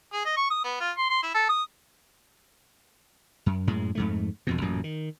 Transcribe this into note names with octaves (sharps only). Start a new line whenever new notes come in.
G#4
D#5
C#6
D#6
B3
F4
C6
C6
E4
A4
D#6
F#2
F#2 A2 G#3
F2 G#2 A3
E1 F2 B2
A1 F#2 A#2
D#3